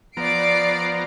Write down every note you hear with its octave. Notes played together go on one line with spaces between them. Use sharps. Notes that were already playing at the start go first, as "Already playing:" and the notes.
F3 B3 D5 A#5 C7 D7